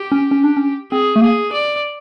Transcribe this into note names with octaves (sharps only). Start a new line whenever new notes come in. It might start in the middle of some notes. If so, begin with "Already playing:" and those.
Already playing: G4
C#4
C#4
D4
C#4
C4 G#4
A3
A#3 G#4
D5